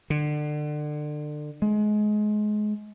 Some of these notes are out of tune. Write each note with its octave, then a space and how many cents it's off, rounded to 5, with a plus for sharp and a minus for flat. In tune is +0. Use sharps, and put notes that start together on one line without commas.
D3 +30
G#3 +25